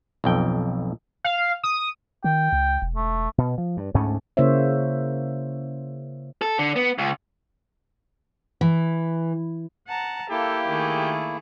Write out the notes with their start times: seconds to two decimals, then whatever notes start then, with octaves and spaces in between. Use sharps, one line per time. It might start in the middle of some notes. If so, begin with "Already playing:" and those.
0.24 B1 F2 G5
1.24 F5
1.64 D#6
2.24 D#3 G5
2.52 C#2
2.82 E1
2.96 A3
3.38 B2
3.58 F3
3.77 G2
3.94 D2 G#2 A3 C#4
4.37 C#3 A#3 E4 C5 C#5 E5
6.42 A4
6.59 D3
6.76 B3
6.98 C#2
8.61 E3
9.87 F#5 A5 A#5
10.31 A#3 E4 G4 A4 F5
10.67 D#3 A3 G#4